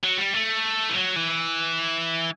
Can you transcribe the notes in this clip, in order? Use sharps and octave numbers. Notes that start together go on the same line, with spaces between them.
F#3
G3
A3
E3
F#3
E3